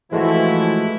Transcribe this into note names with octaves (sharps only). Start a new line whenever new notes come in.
E3 F3 G#3 A3 E4 F#4